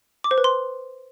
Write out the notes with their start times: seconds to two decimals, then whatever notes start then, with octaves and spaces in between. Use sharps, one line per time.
0.24 D6
0.31 C5
0.38 B4
0.44 C6